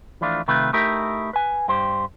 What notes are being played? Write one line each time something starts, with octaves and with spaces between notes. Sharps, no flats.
E3 F3 A3 D4 F4
C3 D#3 A3 F4 B4
A3 D#4 E4 G4 A#4
B4 G#5
G2 G4 C5